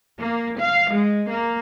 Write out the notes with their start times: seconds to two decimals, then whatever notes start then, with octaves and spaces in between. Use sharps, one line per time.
0.19 A#3
0.58 F5
0.91 G#3
1.29 A#3